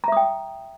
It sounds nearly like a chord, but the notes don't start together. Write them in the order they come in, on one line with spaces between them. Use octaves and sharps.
A#5 E5 D#6 G5